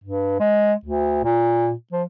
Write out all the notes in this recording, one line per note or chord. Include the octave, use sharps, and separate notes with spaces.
G2
G#3
D2
A#2
F3